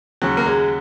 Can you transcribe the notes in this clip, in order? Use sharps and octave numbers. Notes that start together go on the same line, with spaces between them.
D#2 C#3 F#3
A#3
G#3